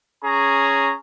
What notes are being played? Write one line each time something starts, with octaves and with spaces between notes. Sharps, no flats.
C#4 G#4 C#5 A#5